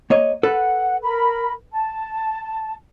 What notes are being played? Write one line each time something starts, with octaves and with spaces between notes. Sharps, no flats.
A#3 C#5 D#5
A4 B4 F#5
A#4 B5
A5